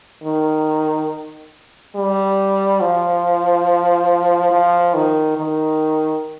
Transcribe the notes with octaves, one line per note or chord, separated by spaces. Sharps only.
D#3
G3
F3
F3
D#3
D#3